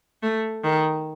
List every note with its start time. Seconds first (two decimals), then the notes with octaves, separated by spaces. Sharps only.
0.22 A3
0.64 D#3